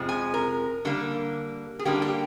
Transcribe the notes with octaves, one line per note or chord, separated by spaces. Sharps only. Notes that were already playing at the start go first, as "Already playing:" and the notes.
Already playing: F2 C3 F3 G#3
G#5
A#4
D3 G3 A#3
G#4
D3 G3 A#3 G4
G4